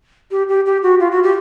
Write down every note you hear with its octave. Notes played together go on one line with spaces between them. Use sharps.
G4
G4
G4
F#4
F4
F#4
G4